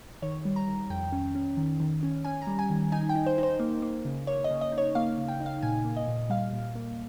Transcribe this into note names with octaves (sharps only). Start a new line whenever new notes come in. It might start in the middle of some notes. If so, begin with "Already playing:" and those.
D#3 C#5
G3
A#5
D#3
F2 G5
C#4
C#4
D#3
D#3
C#4
C#4 G#5
A#5
G3
G#5
D#3
D#4 G#5
G5
D#4
C5
D#4
C5
A#3
A#3
C#3
A#3 C#5
D#5
C#3
D#5
D#4
C#5
A#3 F5
C#3
G5
D#4
F5
A#2 G#5
A#3
D#5
A#2
G3 F5
A#2
A#3